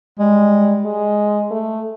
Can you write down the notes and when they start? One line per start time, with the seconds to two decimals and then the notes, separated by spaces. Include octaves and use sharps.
0.19 G3 G#3
0.85 G#3
1.51 A3